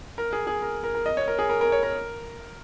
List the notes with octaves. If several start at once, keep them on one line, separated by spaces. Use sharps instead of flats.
A#4
G#4
G#4
A#4
A#4
A#4
D#5
C#5
A#4
G#4
A#4
A#4
C#5
A#4